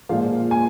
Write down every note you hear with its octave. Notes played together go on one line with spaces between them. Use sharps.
A#2 F3 G#3 F5
G#5